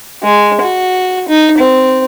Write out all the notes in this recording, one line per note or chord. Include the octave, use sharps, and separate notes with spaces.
G#3
F#4
D#4
C4